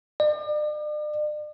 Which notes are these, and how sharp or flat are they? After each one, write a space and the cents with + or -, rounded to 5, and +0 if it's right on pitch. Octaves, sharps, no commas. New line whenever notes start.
D5 +40